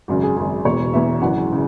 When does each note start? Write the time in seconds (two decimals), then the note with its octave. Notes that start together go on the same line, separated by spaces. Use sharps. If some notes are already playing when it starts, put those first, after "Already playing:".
0.08 G#1 F#2 C#3 F#4
0.23 G#4
0.37 G#1 F#2 C#3 G#4
0.65 E1 E2 B2 C#5
0.93 E1 E2 B2 E5
1.21 G#1 F#2 C#3 E3 F#5
1.52 C#3